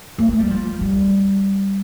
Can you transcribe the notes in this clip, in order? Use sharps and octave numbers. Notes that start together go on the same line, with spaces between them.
A#3
A3
G3
F3
G3